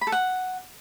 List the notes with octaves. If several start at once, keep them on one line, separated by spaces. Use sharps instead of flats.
B5
A4
F#5